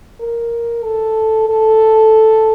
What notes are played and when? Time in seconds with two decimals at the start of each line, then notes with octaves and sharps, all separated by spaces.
0.21 A#4
0.84 A4
1.49 A4